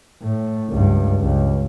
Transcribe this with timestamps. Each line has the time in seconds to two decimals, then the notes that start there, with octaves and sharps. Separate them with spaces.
0.22 A2
0.70 C#2 G2
1.21 C#2